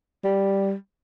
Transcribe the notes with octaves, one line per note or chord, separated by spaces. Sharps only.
G3